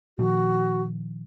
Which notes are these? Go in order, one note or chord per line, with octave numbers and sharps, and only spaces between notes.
A#2 D#3 F3 F#4